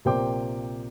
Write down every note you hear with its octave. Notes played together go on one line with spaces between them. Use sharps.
A#1 C3 A#3 C5 G5 D6